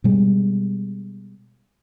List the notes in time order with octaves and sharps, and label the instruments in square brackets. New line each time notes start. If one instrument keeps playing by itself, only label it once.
[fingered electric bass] B2 G3 G#3